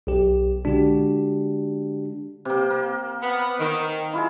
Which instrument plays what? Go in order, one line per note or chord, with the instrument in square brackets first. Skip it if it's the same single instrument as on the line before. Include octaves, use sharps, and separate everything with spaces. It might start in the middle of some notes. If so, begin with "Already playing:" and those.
[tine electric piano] B1 G4
[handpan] D3 G#3 F#4 [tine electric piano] D4 G4
[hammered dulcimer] C3 A#3
A#3
[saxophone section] B3
D#3
[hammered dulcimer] E4 F4 G#4